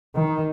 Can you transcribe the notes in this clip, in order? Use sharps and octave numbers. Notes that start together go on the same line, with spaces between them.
D#3